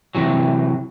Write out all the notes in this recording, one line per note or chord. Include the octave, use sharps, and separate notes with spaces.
C3 E3 F#3